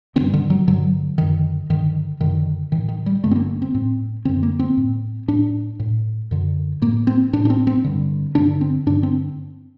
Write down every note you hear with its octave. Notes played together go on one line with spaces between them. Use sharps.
G2 D3 C4
D3
F#3
G2 D3 F#3
F#2 D3 D#3
G2 D3 D#3
F#2 D3 D#3
A2 D#3
D#3
G3
G2 D3 A3
C4
A#3
C4
A2 C4
F#2 D3 C4
A#3
C4
A2
A2 D4
A2
F#2 D3
A2 A#3
C4
A2 D4
D4
C4
C4
G2 D3
G2 D3 D4
C4
G2 D3 D4
C4